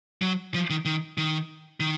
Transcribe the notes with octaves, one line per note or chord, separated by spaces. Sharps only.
F#3
F3
D#3
D#3
D#3
D#3